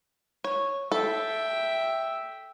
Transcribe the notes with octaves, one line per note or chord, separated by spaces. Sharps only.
C#5
A4 E5 G5